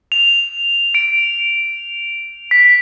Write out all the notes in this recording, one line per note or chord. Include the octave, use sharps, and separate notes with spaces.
F7
D7
B6